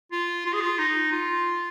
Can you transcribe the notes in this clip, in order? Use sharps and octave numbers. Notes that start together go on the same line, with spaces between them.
F4
F4
G#4
F4
D#4
F4